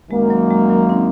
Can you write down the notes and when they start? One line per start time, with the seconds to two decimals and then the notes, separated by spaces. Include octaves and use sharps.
0.11 F#2 D#3 G#3 A#3
0.30 F#3
0.51 G#3
0.70 F#3
0.89 C4 D#4